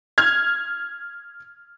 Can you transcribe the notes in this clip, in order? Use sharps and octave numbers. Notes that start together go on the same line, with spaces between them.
F6 G#6